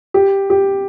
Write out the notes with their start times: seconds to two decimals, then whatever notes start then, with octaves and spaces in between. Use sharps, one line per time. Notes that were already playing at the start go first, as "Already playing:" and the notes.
0.14 G4
0.50 G4